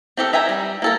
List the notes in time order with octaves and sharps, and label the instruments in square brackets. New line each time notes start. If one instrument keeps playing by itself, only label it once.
[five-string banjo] C4 G4 A4 A#4
B4 E5 G5 G#5 A#5
G3
A#3 A4 A#4